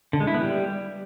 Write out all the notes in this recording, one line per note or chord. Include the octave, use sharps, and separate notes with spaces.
D3
G#3
E4
B3
G3